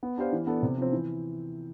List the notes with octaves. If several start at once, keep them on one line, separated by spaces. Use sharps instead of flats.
B3
D4 G4 C5 F5
E3
B3 D4 A4
C3
F3 C4
E3